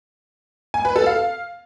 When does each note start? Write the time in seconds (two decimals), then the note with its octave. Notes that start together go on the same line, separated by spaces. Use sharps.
0.74 G#5
0.85 B4
0.96 A4
1.06 F5